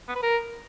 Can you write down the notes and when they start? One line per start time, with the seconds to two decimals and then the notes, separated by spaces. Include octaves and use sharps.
0.08 B3
0.15 B4
0.23 A#4